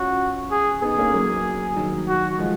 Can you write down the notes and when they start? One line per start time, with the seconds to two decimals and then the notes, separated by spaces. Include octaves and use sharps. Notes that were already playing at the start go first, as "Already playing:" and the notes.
Already playing: C#4 F4 F#4
0.51 G#4
0.82 B3 D#4 G#4
0.98 A#3 C#4
1.13 F#3 A#3
1.76 D#3 F#3
2.08 F#4
2.39 F3 G#3